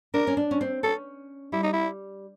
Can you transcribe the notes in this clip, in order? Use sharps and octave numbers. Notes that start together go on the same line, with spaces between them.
D4 A#4
C#4
D4
C#4
C4
C#4 A4
G3 E4
D#4
E4